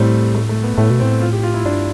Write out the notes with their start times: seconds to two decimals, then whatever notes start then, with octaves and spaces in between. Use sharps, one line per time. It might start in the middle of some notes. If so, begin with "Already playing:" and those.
Already playing: A2 G3 A3 C4
0.35 A3
0.49 A3
0.63 B3
0.78 A2 A3
0.90 B2
1.00 C4
1.03 A2
1.21 F4
1.33 G4
1.43 F4
1.54 E4
1.64 G2 D4